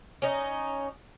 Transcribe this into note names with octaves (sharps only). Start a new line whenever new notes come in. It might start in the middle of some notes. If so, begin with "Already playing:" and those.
C#4 D#4